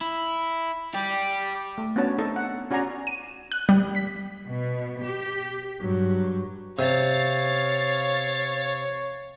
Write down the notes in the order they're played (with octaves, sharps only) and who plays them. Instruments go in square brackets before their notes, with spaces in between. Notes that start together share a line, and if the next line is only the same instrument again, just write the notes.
[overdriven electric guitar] E4
G4 D5
[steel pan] A3
B3 C#4 D4 F#4 C#5 A5
C4 D#4 A4 D#5
F#5
C#4 F#4 D5 G#5 A#5
[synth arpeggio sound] D#7
F#6
G3
B6
[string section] B2
G4
[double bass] G2 F#3
[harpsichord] C3 [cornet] C#5 [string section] F5 A6